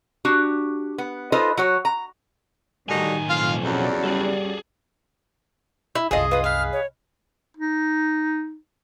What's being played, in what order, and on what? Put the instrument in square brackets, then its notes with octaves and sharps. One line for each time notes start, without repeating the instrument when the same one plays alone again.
[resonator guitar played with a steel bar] D4 F#4 G4
B3
D#4 F4 A4 B4 C5 D#5
F#3 F#4 C#5
A#5
[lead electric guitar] B1 G#5 [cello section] A2 D#3 [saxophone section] D3 D#4 F#4 [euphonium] G3
[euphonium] F2 [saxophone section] F4 F5
[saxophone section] E2 C#3 F#3 [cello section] C#4 F#4 D5
[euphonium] G3 [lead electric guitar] G#4 A4
[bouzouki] E4
[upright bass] C2 F#2 [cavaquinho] F4 A4 [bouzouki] G#4 D#5
[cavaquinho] F4 D#6 [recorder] B4
[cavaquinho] B4 F5 [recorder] F6
[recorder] C#5
[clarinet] D#4